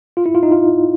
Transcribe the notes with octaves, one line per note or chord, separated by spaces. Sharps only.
F4
E4
F4
D#4
F4